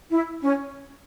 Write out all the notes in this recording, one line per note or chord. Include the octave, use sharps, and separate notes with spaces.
E4
C#4